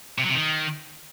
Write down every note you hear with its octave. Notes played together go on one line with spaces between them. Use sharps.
C3
F#3
C3
D#3